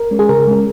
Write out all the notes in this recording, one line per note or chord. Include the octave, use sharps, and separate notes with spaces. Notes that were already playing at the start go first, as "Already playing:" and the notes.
Already playing: A#4
G#3 C#4
G#4
C#3 A#4
G#3 C#4